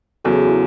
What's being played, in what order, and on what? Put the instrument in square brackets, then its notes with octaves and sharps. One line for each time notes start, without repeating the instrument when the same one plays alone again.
[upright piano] E2 C#3 F#3 [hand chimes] F#4 A4
[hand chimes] G#4
F#4
E4